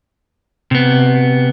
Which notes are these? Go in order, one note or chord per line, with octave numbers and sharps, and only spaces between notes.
C3 B3